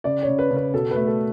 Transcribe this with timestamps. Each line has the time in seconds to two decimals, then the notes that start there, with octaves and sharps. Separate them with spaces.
0.04 C#3 D5
0.23 C#5
0.28 C#3
0.39 B4
0.51 C#3
0.56 B4
0.74 B2 A4
0.91 A3 B4
1.07 A4